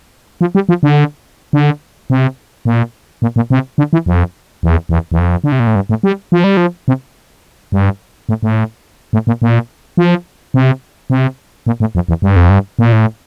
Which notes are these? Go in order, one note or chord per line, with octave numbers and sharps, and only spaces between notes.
F3
G3
F3
D3
D3
C3
A#2
A#2
A#2
C3
D3
E3
F2
E2
E2
E2
F2
D3
C3
A#2
A2
G2
A2
G3
F3
G3
F3
C3
G2
A2
A2
A2
A#2
A#2
F3
C3
C3
A#2
A2
F2
E2
G2
F2
G2
A#2
A2